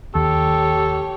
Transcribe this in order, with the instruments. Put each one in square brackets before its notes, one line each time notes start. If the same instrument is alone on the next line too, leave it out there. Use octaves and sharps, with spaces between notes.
[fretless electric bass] D#2 [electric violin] G4 C#5 [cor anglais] A4